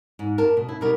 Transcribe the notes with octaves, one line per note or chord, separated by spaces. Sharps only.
G#2
G2 A#4 A5
B2
E4
B2 G3 B3 D#4 A#4